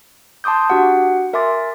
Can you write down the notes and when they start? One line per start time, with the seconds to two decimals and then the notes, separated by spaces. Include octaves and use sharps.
0.44 A5 C6 D6 D#6 G6
0.70 D4 F#4 G4 F#5
1.33 A#4 E5 G#5 C6 D6 A6